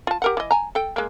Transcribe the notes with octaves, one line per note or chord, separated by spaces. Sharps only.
F4 A5
G4 A#4 F#5
E3 D#5
G#5 A#5
A4 G5
G#3 A#3